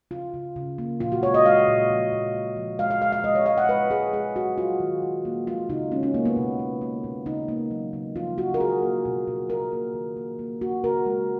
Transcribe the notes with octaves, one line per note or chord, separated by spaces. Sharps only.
C#3 F4
C#3
C#3
A#3
A#2 F4
F#4
G#3 C#5
D#5
G#3 F5
A#2
F3
A#2
A#2
F3
G#3 F5
F5
G#3 F5
F5
G#3 D#5
C#5
G#3 F5
F#5
G#3 B4
G#3 G#4
G#3 G#4
G#3 F#4
F#3 F4
D#3
D#3
A#3
G#3 F4
C#3 D#4
G#3 C#4
C#4
G#3 A#3
B3
B2
A#3
A#3
B2
C#3 D#4
A#3
F#3
C#3
F3 F4
C#3 F#4
A#4
C#3 G#4
A#3
B2
B2
B2 A#4
A#3
D#3
A#3
A#3
A#3 F#4
C#3 A#4
G#3